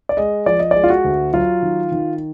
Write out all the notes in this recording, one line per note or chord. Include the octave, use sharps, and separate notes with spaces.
D5
G#3 D#5
F3 D5
D#5
G#3 D5
F4
F#4
D2
F#3 F4
D#3
D#3